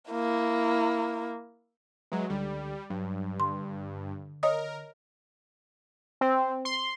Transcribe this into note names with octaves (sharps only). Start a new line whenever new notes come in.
A#3 E4
F#3 G#3 B4 E5 A#5
C#2 D3 G3
G2 F#3
D3 C6
A#4 C#5 D#5 D#6
C4
C6